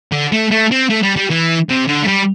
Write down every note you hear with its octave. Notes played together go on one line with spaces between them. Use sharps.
D3
A3
A3
C4
A3
G3
G3
E3
C3
D3
A3
G3